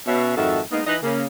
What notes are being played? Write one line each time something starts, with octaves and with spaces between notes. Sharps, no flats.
B2 C#4 E5
F2 G#2 D#3 F#4 A4 E5
G#3 A#3 B3 D#4
E3 D#4 B4 D#5
C#3 A#3